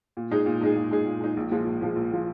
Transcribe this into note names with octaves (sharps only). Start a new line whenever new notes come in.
A#2
G#3 D#4 G#4
A#2
G#3 D#4 G#4
A#2
G#3 D#4 G#4
A#2
G#3 D#4 G#4
A#1
A#2 F3 G#3
A#1
A#2 F3 G#3
A#1
A#2 F3 G#3